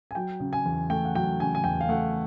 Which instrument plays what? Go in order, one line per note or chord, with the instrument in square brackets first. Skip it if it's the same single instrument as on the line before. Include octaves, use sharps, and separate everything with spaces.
[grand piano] G#5
F#3 G5
C#3
G#5
E2
A3 G5
F#5
F#3 G5
C#3 G#5
G#5
E2 G5
F5
A3 F#5